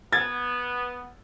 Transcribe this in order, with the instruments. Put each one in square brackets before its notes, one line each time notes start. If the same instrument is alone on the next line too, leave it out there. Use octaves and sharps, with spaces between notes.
[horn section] B3 [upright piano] G#6 A6